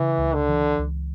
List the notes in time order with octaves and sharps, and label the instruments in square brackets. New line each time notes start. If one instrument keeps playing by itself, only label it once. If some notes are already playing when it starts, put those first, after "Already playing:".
Already playing: [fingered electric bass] C#3 [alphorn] E3
[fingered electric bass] C#2
[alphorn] D3
[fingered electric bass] E3
C#2